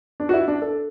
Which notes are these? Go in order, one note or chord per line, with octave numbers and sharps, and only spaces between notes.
D4
F#4
E4
D4
A4